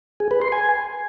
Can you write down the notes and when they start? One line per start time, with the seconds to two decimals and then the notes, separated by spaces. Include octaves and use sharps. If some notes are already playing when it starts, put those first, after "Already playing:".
0.20 G#4
0.31 B4
0.42 C6
0.52 G#5